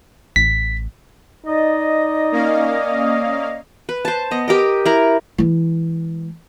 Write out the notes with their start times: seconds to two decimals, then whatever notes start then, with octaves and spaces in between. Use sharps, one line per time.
0.36 A1 B6
1.47 D#4 D5 D#5
2.32 A#3 C#4 F5
3.89 B4
4.05 C5 A5
4.31 B3 D#5
4.48 G4 A#4 D#5
4.85 E4 A#4
5.38 E3 G#3